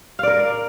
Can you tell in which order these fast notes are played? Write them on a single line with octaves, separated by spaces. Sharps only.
F5 D5 A#4